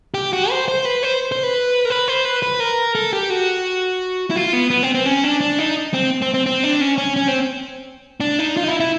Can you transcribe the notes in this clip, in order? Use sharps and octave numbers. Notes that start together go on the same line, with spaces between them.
G4
F#4
C5
C5
B4
C5
C5
B4
A#4
B4
C5
B4
B4
A#4
A4
G4
F#4
E4
F4
B3
B3
C4
C4
C#4
D4
D4
D#4
C4
C4
C4
C4
D4
C#4
C#4
C#4
C4
D4
D#4
F4
D#4
E4
E4